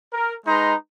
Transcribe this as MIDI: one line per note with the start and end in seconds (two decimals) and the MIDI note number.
0.13 0.33 70
0.47 0.74 56
0.47 0.74 63
0.47 0.74 71
0.47 0.74 82
0.47 0.74 84